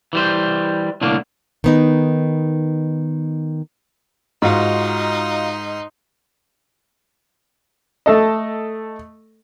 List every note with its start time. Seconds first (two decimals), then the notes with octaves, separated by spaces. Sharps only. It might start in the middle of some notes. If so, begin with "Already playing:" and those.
0.13 E3 G3 C5
1.01 C2 A2 D3 A#3
1.64 D#3 B3 D#4
4.42 G#2 D#4 F4 F#4 F5 C6
8.06 A3 A4 D#5